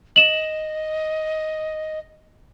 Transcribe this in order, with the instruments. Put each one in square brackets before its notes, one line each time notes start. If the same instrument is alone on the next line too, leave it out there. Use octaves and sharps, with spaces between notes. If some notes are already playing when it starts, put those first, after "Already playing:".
[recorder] D#5 [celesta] E7 F#7